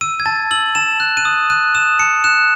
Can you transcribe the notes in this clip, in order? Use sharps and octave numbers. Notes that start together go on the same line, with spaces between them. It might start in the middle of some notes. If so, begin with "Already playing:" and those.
E6 D#7
G#6
A5 A6
E6 F#7
A5 E7
F#6
D#7
D#6
F#6 D#7
D#6 E7
A5 C#7
F#6 E7